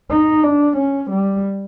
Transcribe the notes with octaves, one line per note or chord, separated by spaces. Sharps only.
D#4
D4
C#4
G3